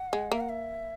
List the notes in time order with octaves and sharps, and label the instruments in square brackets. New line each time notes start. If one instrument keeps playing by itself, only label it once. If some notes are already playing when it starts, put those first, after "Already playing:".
Already playing: [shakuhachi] F#5
[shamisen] G#3
[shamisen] A#3 [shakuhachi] E5
[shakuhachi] F#5
E5